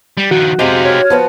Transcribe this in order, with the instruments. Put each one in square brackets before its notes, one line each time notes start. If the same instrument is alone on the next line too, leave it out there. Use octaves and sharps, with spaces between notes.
[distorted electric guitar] G3
[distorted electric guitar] D#3 F3 [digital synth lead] F#4
[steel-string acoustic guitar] C3 G#3 [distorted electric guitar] G4 F5
[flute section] C#5 F6 G#6
[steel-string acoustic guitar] F3 B3 F#4